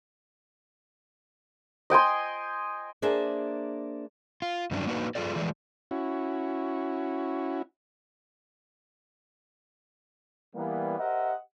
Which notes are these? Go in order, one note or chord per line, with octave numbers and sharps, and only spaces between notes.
D#5 G5 G#5 C6
A#3 D4 G#4 C5 E5
F4
G2 D#3 F#3 C#4 D4
A#3 D4 D#4 F#4 G#4 B4
G2 F4 G#4 A4 D5
E3 F3 G#3 A3 D5
C#4 E4 F#4
E3 G3 A#3 B3
G4 A#4 C5 D#5 E5 F#5